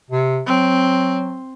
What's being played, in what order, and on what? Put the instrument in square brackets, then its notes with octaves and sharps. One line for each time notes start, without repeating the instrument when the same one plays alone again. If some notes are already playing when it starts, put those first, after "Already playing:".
[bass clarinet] C3
[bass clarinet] F#3 [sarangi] C4